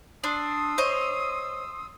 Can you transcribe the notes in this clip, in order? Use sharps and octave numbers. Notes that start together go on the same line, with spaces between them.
D4 C6 D#6 E6
C5 C#5 D#5